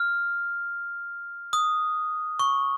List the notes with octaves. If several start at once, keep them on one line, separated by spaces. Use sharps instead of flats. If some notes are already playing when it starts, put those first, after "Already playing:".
Already playing: F6
D#6
C#6